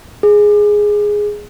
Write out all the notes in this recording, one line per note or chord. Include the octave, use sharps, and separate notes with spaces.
G#4